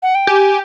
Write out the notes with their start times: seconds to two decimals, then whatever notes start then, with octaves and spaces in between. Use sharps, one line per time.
0.03 F#5
0.15 G5
0.27 G4 G#5